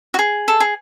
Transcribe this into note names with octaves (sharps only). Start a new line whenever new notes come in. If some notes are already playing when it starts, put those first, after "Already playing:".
F#4
G#4
A4
G#4